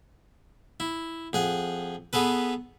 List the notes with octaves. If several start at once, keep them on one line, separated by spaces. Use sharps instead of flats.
E4
F2 G#4 F#5
B3 G#4 A4 B4